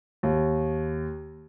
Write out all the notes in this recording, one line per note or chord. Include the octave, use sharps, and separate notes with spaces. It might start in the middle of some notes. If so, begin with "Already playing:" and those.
D#2